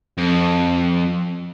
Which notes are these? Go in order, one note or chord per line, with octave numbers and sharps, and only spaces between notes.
F2